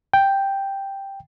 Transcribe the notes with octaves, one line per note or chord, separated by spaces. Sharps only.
G5